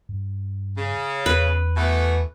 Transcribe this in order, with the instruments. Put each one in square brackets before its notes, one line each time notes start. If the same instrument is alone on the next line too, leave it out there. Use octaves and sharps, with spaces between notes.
[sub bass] G2
[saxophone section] C#3
[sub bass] E2 [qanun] B4
[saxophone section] B2 E3 A3